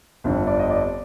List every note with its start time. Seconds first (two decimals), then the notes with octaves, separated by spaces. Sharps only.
0.24 G1 F2 D3 G3
0.47 D5
0.59 D#5
0.70 D5